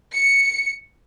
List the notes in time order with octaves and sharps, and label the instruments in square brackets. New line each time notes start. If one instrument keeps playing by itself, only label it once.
[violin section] C#7